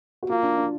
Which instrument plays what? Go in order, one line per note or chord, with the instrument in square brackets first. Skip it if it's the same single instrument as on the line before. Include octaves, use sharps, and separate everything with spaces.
[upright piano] F#4
[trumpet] A#3 [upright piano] F4
[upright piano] D4
D4